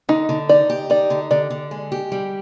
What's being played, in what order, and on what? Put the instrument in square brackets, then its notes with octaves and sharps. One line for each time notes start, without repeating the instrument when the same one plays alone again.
[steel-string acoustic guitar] D3 [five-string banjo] D#4
[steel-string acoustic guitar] D3
[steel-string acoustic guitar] D#4 [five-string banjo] D5
[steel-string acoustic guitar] G4
[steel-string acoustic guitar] D#4 [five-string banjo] D5
[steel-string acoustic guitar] D3
[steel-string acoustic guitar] D3 [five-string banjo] D5
[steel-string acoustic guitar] D3
G#3
G4
G3